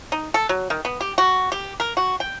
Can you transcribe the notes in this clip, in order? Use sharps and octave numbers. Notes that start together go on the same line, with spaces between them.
D#4
A4
F#3
D#3
B3
G4
F#4
G4
A#4
F#4
G5